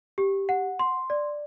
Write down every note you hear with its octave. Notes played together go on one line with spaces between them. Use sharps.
G4
F#5
C6
D5